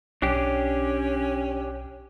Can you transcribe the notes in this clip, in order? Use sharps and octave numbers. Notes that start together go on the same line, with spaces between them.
B1 C#4 D4 G4